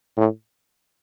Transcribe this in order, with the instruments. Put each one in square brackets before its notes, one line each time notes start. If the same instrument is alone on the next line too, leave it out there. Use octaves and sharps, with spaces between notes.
[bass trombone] A2